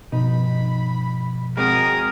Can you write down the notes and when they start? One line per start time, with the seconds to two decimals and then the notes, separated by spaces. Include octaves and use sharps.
0.12 G2 B2 F3 D#4 B5
1.57 G#3 C4 F#4 G#4 A#4 D#6